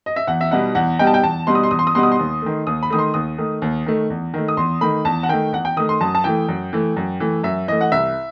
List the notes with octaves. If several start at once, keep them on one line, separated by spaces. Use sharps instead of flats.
D#5
E5
E2 F#5
E5
B2 G3 B3 D#4 F#5
E2 F#5
B2 G3 B3 D#4 G5
A5
G5
E2 A5
B2 G3 B3 D#4 C6
D#6
C6
E2 D#6
C6
D#6
B2 G3 B3 D#4 C6
D#6
C6
D#2
D#3 A3
D#2 D#6
B5
D#3 A3 D#6
C6
D#2 D#6
D#3 A3
D#2
D#3 A3
E2
D#3 A3
D#6
E2 C6
D#3 A3 B5
E2 A5
F#5
D#3 A3 G5
E2 F#5
G5
D#3 A3 D#6
C6
F#2 A5
A5
E3 A3 G5
F#2
E3 A3
F#2
E3 A3
F#2 E5
E3 A3 D#5
F#5
C2 E5